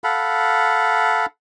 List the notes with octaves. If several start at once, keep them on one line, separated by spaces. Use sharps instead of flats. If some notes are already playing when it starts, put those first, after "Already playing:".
A4 F5 F#5 B5